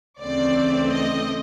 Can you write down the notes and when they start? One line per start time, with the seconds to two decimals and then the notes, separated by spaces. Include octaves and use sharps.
0.21 D2 C#3 E3 A3 C4 D5
0.91 D#5